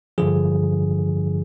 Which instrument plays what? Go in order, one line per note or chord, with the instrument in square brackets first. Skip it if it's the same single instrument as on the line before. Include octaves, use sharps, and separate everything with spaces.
[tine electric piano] G2 D3 F3 G#4